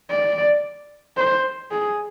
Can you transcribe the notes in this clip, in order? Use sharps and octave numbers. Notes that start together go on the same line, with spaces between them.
D5
C5
G#4